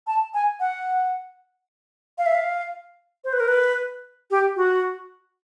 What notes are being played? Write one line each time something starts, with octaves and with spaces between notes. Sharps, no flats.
A5
G#5
F#5
F5
E5
F5
C5
B4
A#4
B4
G4
F#4